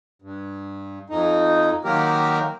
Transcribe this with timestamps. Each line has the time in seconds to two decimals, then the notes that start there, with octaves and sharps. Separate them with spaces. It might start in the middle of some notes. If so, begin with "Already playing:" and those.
0.22 G2
1.10 F2 D#4
1.85 D#3 F#3 A#3 G4 A#4